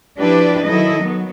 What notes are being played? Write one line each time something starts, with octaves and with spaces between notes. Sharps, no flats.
F3 D4 E4 G4 B4 D5
D#3 F#3 E4 A4 D#5
F#3 B3